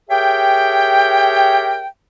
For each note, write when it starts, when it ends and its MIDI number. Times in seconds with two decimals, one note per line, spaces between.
0.10 1.85 67
0.10 1.85 68
0.10 1.85 70
0.10 1.85 73
0.10 1.85 76
0.10 1.85 79